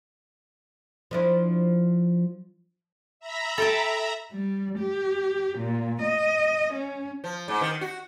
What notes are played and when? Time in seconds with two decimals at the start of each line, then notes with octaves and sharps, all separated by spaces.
1.11 F3 D4 E4
3.20 E5 A#5 B5
3.58 A4 G5 A5
4.32 G3
4.78 G4
5.58 A#2
6.01 D#5
6.73 C#4
7.24 F3
7.48 G#2
7.61 D#3
7.81 F#4